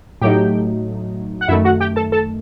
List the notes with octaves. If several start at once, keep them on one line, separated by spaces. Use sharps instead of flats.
A2 F#3 A3 D#4 G4 G5
F#5
F#2 D#3 A3 E4 E5
F#4 F#5
G4 G5
A4 A5
A4 A5